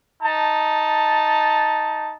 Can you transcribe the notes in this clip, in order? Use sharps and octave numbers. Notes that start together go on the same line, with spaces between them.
D#4 A5